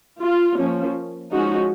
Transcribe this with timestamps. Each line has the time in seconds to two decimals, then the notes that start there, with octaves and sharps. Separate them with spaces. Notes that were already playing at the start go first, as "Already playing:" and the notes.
0.21 F4
0.58 F3 A#3 C#4
1.32 F3 G#3 C#4 D#4 F#4